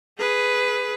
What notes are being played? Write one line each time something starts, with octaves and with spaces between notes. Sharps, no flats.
G#4 B4